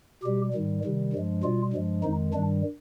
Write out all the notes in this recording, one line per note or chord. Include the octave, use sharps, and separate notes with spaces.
B2 G3 G4
G#2 D#3 G3
C3 D#3 G3
G2 F3 G#3
B2 G3 F4
G2 F3 G#3
F2 D#3 G#3 D#4
G2 D#3 G3 D4